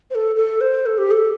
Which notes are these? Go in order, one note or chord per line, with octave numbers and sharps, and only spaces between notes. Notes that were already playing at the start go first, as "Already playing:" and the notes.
C5
A4
A4
C5
A4
G4
A4